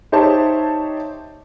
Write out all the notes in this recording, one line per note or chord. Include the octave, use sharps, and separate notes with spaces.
D#4 G4 C5 C#5 E5 A5